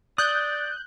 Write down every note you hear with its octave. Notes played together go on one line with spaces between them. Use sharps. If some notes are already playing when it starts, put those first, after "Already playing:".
D5 D#6 F#6 G6